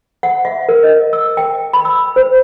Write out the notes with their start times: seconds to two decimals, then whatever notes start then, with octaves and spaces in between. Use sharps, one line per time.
0.23 F#5
0.45 E5
0.69 A#4
0.83 D#5
1.13 E6
1.37 G5
1.73 B5
1.85 E6
2.16 C5